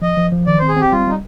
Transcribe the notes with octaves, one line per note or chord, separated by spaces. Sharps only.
F3 D#5
F3
F3
D#3 D5
C4 C5
G#4
C4 G4
G3 F4
G3 D#4